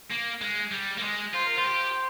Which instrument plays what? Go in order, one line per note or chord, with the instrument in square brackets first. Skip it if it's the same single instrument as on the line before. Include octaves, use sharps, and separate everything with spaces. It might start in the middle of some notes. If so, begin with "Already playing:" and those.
[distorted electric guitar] A#3
G#3
G3
A#3
G#3
[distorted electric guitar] F4 [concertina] C5
[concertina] A#4
[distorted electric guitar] F4 [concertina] C5
[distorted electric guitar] G4